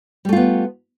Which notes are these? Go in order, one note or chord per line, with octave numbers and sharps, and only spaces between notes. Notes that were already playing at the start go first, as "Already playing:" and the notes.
G3 A3 B3 F4